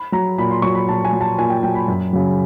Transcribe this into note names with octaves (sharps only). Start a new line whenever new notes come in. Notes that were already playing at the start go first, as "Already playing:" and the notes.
Already playing: B5
F#3 A#5
A#2 B5
C6
F#3 C#6
B5
A#2 A5
G#5
F#3
A5
A#2 G#5
G5
F#3 G5
B5
F#2
C#3 F#3